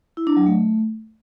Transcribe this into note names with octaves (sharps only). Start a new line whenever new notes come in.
E4
D4
F#3
A3